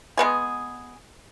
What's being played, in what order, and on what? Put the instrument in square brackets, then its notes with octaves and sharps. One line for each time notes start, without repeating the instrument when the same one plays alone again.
[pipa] G#3 B3 G#4